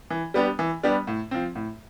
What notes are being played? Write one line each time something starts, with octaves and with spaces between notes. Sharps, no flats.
E3
G3 B3 D4 G4
E3
G3 B3 D4 G4
A2
F3 C4
A2